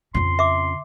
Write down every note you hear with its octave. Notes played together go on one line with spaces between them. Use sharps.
F2 C#3 C6
E5 D6